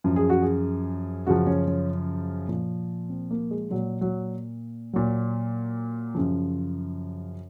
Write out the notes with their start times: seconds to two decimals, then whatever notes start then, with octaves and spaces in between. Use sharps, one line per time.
0.04 F#2 F3
0.16 G#4
0.30 F#4
0.42 G#4
1.26 F#2 C#3 F3 F#4
1.47 C#4
1.67 C#4
2.49 A#2 F3
3.09 C4
3.31 A#3
3.51 G#3
3.71 A#2 F#3
4.01 F#3
4.93 A#2 F#3
6.15 F#2 C#3 F3